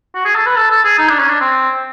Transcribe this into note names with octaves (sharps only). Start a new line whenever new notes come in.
F#4
G#4
A4
B4
A4
A4
G#4
D#4
D4
C#4
D4
C4